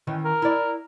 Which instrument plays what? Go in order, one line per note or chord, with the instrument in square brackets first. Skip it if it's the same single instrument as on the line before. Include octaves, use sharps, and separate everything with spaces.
[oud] D#3 E3 C#4
[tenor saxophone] A#4
[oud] E4 D5